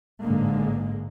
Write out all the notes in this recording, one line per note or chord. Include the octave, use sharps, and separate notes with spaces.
A1 G#2 D3 G#3 A#3